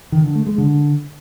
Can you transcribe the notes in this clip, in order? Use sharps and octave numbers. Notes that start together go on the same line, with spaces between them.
D#3
D3
A3
G#3
D3